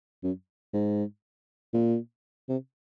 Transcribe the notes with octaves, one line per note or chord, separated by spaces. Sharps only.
F#2
G#2
A#2
C3